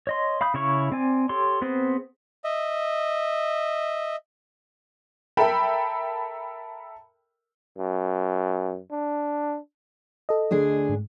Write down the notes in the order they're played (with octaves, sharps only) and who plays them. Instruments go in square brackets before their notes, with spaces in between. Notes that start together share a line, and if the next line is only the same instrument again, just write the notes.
[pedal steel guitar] C#5 D#5 C6
F5 B5 D#6 G6
C#3 E4 C#5 F5 C#6
C4 D5 G#5
G4 A4 C#5 C6
B3 C4 G#4 C5
[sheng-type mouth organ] D#5 E5
[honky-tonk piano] A4 A#4 E5 G5 B5
[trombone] F#2
D4
[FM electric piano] A4 D#5
[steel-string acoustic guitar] D2 D4 G#4
[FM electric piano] G#2